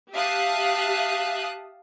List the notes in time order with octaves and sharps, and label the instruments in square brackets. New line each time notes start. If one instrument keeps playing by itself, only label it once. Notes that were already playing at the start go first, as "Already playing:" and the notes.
[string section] G4 E5 F5 A5 D#6 F#6